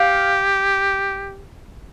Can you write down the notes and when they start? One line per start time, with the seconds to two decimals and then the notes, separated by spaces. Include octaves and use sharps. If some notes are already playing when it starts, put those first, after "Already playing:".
Already playing: G4 F5